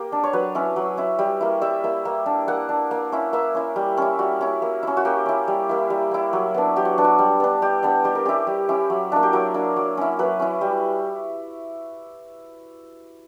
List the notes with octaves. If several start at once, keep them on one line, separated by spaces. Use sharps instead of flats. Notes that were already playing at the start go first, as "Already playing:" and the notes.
Already playing: A#3 G4
D4
C#5
F#3 B4
C#4 E4
F#3
C#4 E4
G3
A#3 E4
G3 E5
A#3 E4
A#3
D4
A#3 F#5
D4
A#3
C#4 E4
A#3 E5
C#4 E4
G3
C#4 E4
G3 F#4
C#4 E4
A#3
C#4 E4
F#4
A#3 G4
C#4 E4
G3
A#3 E4
G3
A#3 E4
F#3
B3 D4
F#3 G4
F#4
B3 D4
F#4
G3
B3 D4
G3 G4
B3 D4
G3 G4
A#4
C#4 E4 G4
G3
C#4 E4
F#3
A#3 D4
G4
F#3 A#4
A#3 D4
F#3
C#4 E4
F#3 B4
C#4 E4
G3